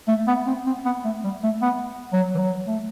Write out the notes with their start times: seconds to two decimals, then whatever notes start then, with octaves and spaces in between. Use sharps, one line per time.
0.08 A3
0.28 B3
0.47 C4
0.67 C4
0.86 B3
1.05 A3
1.24 G3
1.43 A3
1.62 B3
2.13 F#3
2.35 E3
2.39 F#3
2.68 A3